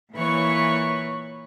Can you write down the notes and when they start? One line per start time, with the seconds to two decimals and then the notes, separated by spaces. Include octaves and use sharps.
0.13 A#2 E3 B4 C#5 C#6